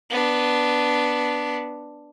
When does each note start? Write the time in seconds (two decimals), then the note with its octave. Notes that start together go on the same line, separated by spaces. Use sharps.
0.10 B3 D4